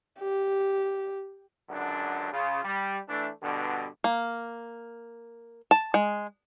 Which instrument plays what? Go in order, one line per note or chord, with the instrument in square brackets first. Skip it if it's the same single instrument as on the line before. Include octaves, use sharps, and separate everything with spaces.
[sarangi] G4
[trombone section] C#2 F#2 D3 D4
C#3 F4
G3
E3 A3 D4
G2 B2 D3
[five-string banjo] A#3
A5
G#3